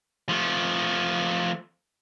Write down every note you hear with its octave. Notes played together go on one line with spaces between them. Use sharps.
F3 A3